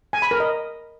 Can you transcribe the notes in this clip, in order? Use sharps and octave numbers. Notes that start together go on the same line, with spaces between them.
G#5
B5
A#4
D#5